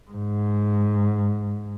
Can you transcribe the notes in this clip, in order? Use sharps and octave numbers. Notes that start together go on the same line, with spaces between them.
G#2